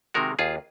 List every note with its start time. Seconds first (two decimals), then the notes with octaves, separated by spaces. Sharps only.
0.14 C3 D#3 G#3 F#4 A#4
0.39 D#2 F4 G#4